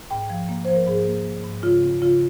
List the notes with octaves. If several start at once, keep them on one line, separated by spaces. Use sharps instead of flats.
G#2 G5
F3
A#3
F3 C5
A#4
G#2 G#4
A#3
A#3
G#2
C#3 F4
C4
C#3 F4